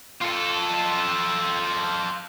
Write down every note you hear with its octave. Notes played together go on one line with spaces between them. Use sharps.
F4 A4